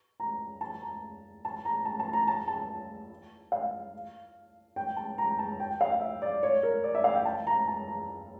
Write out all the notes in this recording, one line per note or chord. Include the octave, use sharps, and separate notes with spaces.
A#5
A5
A#5
A5
A#5
A5
A5
A#5
A5
A5
F5
G5
A5
A#5
A5
G5
F5
E5
D5
C#5
A#4
D5
E5
F5
G5
A5
A#5
A5
A#5